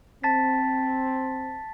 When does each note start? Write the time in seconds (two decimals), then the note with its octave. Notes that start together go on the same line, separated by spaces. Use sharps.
0.23 C4 A5 A6 B6